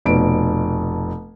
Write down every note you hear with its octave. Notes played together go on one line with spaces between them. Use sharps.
F1 B2 D7